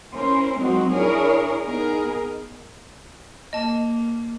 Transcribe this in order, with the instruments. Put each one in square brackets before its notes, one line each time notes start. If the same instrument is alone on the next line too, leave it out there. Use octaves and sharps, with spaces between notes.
[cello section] C#4 E4 A#4 C5
F3 F#3 G#3 C4 D#4 F#4
D4 E4 G#4 A#4 C#5
B3 D#4 G#4 A#4
[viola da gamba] A#3 [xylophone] D#5 A5